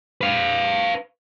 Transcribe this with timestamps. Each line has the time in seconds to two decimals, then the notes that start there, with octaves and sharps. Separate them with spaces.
0.21 B4 F5